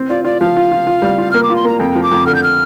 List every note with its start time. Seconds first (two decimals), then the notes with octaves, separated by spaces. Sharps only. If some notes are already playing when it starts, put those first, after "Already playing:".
Already playing: C4
0.09 F4 D5
0.24 F4 D5
0.41 F3 F5
0.57 F4
0.72 F4
0.87 F4
1.02 G3
1.18 F4
1.31 A#3 F6
1.43 D6
1.50 F4
1.56 C6
1.64 A#3 A#5
1.80 F2 G5
1.95 F3
2.03 D6
2.11 F2
2.26 D3 F6
2.35 G6
2.43 F6